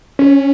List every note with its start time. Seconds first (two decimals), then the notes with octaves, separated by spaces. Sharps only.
0.19 C#4